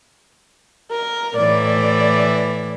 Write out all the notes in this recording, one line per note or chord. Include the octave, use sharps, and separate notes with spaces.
A#4
A2 E3 D5